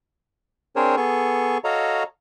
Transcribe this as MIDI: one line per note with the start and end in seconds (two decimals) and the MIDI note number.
0.76 0.96 60
0.76 0.96 62
0.76 0.96 68
0.76 0.96 70
0.76 0.96 72
0.76 0.96 73
0.97 1.58 59
0.97 1.58 68
0.97 1.58 69
0.97 1.58 85
1.64 2.03 66
1.64 2.03 69
1.64 2.03 73
1.64 2.03 75
1.64 2.03 77
1.64 2.03 82